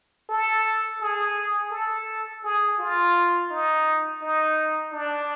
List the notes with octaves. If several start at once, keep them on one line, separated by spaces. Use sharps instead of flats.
A4
G#4
A4
G#4
F4
D#4
D#4
D4